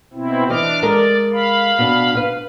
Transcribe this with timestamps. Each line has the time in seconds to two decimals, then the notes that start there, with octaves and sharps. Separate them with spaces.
0.13 B2 C4 E4
0.50 E3 D4 D#5 D6 F6
0.82 G#3 A4 A#4 D5
1.33 F5 B5
1.79 B2 D4
2.15 B4 F5